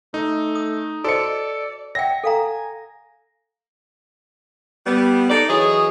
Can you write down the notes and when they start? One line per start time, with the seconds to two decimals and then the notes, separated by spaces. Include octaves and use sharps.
0.14 A3 D#4
0.55 D#6
1.04 F#4 A4 C5 D5 D#5 C#7
1.95 D5 E5 F#5 G5 A#6
2.24 A4 F5 G#5 A#5
4.87 G3 B3
5.30 D#4 A4 D5
5.49 E3 F#3 G#4 C#5 D#5